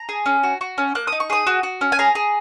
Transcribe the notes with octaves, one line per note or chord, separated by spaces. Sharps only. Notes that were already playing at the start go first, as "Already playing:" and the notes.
Already playing: A#5
G#4
C#4
F#4
F#4
C#4
A#3 F#6
D#4 D#6
C#6
G#4 D#6
F#4
F#4
C#4
G#5
G#4 A#5
G#4